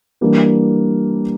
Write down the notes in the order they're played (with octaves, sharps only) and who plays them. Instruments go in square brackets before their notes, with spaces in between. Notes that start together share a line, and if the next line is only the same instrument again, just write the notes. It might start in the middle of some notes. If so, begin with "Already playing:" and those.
[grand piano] E3 G3 A#3 D4